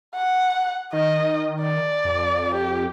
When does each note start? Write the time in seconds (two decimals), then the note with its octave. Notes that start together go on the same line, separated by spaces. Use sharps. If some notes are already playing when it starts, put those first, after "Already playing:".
0.15 F#5
0.93 D#3 D#5
1.61 D5
2.04 F2
2.55 G4